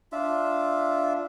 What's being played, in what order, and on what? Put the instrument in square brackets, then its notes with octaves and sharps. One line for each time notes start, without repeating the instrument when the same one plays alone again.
[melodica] D4 F4 E5